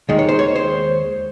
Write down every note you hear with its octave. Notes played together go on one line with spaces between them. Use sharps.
D#2 D#3 G#3
C#5
C5
C#5
C5